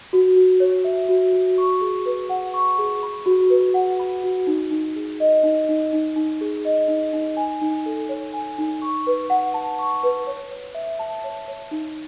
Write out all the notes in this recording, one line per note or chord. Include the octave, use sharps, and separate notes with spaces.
F#4
F#4
C#5
E5
F#4
F#4
C#6
G#4
B4
F#5
C#6
G#4
B5
F#4
B4
F#5
B5
F#4
D#4
D#4
G#4
D#5
D#4
D#4
D#4
D#4
G#4
D#5
D#4
D#4
G#5
D#4
A4
C#5
G#5
D#4
C#6
B4
F#5
A5
C#6
B4
C#5
C#5
E5
A5
C#5
C#5
D#4